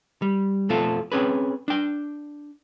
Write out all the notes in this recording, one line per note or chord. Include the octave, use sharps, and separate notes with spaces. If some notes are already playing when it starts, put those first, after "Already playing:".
G3
F2 B2 A3 C4 F4 A4
C4 C#4 G#4 B4
D4 G5